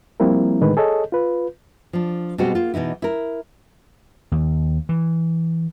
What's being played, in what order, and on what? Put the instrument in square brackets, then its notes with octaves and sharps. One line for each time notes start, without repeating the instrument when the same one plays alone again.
[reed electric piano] F3 G3 A#3 C4 E4 A#4
A2 D3 D#3 G#3 B4
G#4 A4 C#5 D#5
F4 B4
[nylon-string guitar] F3 D4
B2 G3 G#3 C4 F#4
A#3 F4
B2 E3 D#4 E4
E4 A#4
[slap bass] D#2
E3